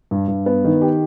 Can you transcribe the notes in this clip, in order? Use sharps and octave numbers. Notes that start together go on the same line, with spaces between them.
G2
G2
B3
D#3
G4